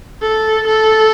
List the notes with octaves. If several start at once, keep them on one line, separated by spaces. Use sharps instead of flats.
A4
A4